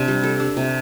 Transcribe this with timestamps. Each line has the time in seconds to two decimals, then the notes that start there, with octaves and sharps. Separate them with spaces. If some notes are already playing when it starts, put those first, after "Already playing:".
Already playing: C3 D4
0.08 G3
0.23 A4
0.40 D4
0.57 C3